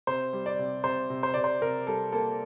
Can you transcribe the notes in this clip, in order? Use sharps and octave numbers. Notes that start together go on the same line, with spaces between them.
C3 C5
G3
D5
C3
C3 C5
C3
C5
C3 D5
C5
C3 A#4
G3 A4
A#3 A4